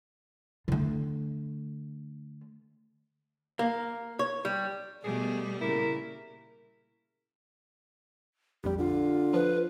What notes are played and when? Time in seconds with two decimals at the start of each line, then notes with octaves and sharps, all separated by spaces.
0.68 D3 A3
3.59 A#3
4.19 C#5
4.45 G3
5.04 B2 G3 A3 B3 G#4
5.61 A#2 C#3 E4 A#4
8.64 A#1 F2 G3 G4
8.79 D3 F4
9.34 F3 B4